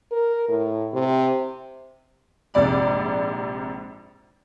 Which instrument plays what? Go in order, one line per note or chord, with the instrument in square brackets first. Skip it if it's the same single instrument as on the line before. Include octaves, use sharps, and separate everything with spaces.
[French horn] A#4
A2
C3
[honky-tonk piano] A#1 G#2 C3 D5 B5